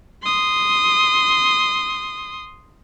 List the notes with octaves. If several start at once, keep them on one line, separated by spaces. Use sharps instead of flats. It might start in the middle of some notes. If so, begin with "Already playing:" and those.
C6 D#6